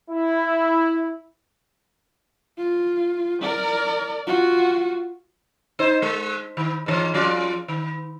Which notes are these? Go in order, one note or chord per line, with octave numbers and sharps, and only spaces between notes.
E4
F4
A#4 D5
F4 F#4
D#4 C5
G#3
D#3
G#2 D3 E3
F3 C#4 F4
D#3